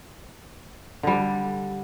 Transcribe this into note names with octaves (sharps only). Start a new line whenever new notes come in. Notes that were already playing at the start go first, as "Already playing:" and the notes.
D3 G3